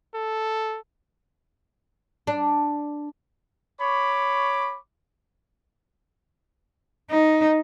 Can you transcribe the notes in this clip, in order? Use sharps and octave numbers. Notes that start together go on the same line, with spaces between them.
A4
D4
C#5 B5 C#6 D6
D#4